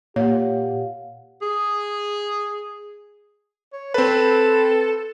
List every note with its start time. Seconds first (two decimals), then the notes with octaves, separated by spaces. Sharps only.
0.16 A#2 G4 C#5 F5 F#5
1.42 G#4
3.73 C#5
3.94 C4 A4 B4